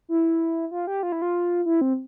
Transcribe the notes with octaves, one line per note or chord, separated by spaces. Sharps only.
E4
F4
G4
F4
E4
F4
E4
C4